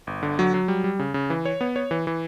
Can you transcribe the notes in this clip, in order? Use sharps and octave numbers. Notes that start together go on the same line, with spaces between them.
G1
D3
F#3
F#3
G3
G3
C#3
C#3
E3
C#5
B3
C#5
E3
E3